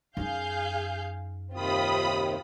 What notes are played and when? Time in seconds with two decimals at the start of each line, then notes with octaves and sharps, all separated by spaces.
0.17 F#2 D#4 G#4 F5 G6
1.53 D#2 C3 D#3 C4 F4 B5 D#6